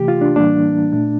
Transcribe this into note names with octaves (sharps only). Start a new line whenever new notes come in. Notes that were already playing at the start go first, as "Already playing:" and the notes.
Already playing: C3 E3 A3 G4
F4
D4
A2 E3 G3 A#3 D4
A#2 A3 D4